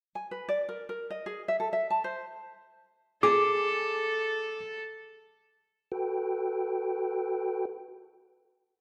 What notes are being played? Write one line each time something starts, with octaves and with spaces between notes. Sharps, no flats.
G#5
B4
D5
A#4
A#4
D#5
G#4
E5
A4
E5
A5
C5
G#4 A4 D6
F#4 A4 B4 G5